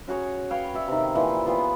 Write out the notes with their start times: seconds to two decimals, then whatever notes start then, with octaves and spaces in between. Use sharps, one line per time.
0.08 C#4 F#4 G#4 C#5
0.51 B4 C#5 F5 G5
0.75 D5 E5
0.88 C3 D#3
1.15 A#2 E3 F3
1.46 B3 F4 G#4 G5